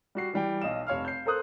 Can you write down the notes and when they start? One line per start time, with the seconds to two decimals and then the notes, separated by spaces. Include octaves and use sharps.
0.15 G3 F#4 C7
0.33 E3 G3 G5
0.61 B1 D#5 F5 E7
0.87 F1 C#5 F5 F6
1.05 G6 C7
1.26 A4 A#4 C5 D#6 F#6